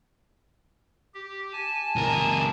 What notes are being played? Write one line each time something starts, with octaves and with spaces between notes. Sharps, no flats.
G4
G#5 A5
C#2 A#4